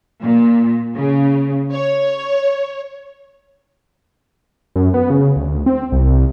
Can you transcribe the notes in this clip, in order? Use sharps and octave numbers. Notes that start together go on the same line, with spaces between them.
A#2
C#3
C#5
F#2
B3
C#3
D2
C4
C2